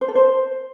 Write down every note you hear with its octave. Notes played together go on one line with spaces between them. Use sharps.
C5
A4
C5